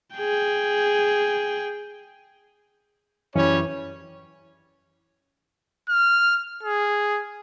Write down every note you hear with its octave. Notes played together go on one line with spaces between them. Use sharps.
G#4 G5
F#2 E3 G3 C#4 E4 C#5
F6
G#4